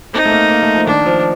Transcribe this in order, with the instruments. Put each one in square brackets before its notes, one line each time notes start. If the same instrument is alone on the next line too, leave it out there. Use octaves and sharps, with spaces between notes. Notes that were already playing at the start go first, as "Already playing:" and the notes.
[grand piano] C4 [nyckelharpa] D#4
[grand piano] A3
A#3
A#3
A3
F3
[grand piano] D#3 [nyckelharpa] D4
[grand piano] F3